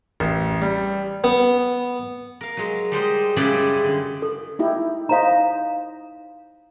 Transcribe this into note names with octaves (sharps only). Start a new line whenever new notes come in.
A1
G3
B3
A#4 F5
F#3 G#3
G3 G#3 C5 D#5
F#2 C#3 G3 G#3 E4 D5
D3
A4
D#4 E4 G4
D#4 C5 D#5 F5 A#5